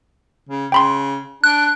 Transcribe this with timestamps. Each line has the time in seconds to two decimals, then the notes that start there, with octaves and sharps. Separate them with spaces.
0.49 C#3
0.72 C#3 G5 B5 C6
1.44 D4 F#6